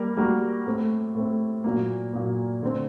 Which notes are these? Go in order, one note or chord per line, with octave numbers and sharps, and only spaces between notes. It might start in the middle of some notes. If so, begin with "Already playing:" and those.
Already playing: G3 A#3 A#4
G3 A#3 F#4 A#4
A2 A3 C4
A2 A3 C4
A#2 F#3 A#3
A#2 F#3 A#3
D3 A3 C4